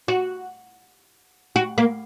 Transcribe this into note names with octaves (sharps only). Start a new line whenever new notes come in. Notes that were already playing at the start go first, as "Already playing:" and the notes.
F#4
F#4
A#3